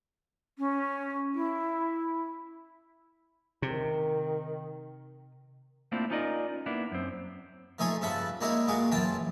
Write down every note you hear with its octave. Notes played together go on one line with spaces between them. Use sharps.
C#4
E4
C3 D#3
A3 A#3 C4 D4 E4 F4
C#4 D#4 F4 A#4 D5 D#5
A#3 B3 D4 E4
F#2 C4
F3 A3 D#4 G#4 C#5
G2 C#3 F3 E5 F#5 A5
G3 G#3 A#3 D#4 E4 C#5
A#2 G#3 A#3 F#4 G#4
F#2 E3 F4 G5 A5